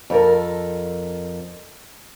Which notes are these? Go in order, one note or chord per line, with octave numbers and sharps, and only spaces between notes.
F2 A4 A#4